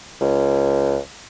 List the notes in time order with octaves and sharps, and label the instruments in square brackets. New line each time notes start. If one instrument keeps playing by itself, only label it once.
[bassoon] C#2